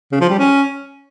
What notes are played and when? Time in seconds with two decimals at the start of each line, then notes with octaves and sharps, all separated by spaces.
0.12 C#3
0.21 F3
0.30 G3
0.38 C#4